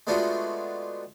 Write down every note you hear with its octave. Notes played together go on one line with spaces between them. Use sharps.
G#3 A3 B3 D4 F4 F#4